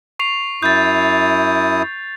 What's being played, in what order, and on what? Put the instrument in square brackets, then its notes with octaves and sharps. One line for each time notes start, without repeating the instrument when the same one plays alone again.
[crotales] C#6 C7 F7
[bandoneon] F#2 E4 D#6 [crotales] G6 A6